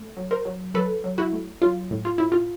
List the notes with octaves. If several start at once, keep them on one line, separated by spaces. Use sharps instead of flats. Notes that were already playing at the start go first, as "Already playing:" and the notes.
Already playing: A3
F#3
A#4 C5
F#3
F#3 A4 B4
F#3
E4 F#4
A3
F#3 F4
A2
F4
A2 E4
F4